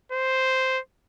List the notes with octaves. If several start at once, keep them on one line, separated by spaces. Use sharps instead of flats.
C5